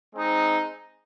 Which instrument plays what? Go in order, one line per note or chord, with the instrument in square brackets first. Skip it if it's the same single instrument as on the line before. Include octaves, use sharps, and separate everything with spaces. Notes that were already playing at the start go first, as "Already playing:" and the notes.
[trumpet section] G#3 C4 D#4